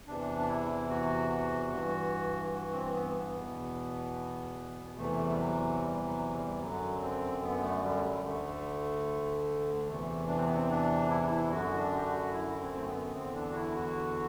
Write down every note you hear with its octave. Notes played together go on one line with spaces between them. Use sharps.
E2 C3 E3 D4
D4
E4
F#4
F#4
G2 E3
F#4
C4
B3
B3
E2 B2
E2 C3 E3 A3
G3
F#3
G3
F#3
G3
F#2 D3 F#3
C4
B3
A3
G3
F#3
G3
D2 D3 A3
E2 C3 E3 A3
D4
C4
B3
C4
D4
E4
D4
E4
F#2 D3 F#4
D4
G4
F#4
E4
C4
A3
B3
E2 D3 C4
D4
F#4
E4
F#4